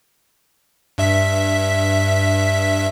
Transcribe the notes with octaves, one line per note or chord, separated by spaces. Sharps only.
G2 E5 B6